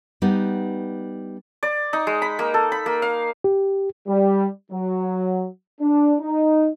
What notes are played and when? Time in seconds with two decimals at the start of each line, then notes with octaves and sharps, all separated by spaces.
0.22 G3 B3 D#4
1.63 D5
1.93 D#4
2.07 G#3
2.22 B5
2.39 A#3
2.54 A4
2.72 B5
2.86 A#3
3.02 F5
3.44 G4
4.08 G3
4.72 F#3
5.81 D4
6.20 D#4